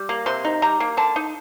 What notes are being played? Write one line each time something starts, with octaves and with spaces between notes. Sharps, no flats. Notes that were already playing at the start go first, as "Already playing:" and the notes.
Already playing: G3
A#3
C3 C6
D#4
G3 A#5
A#3
D3 A5
D#4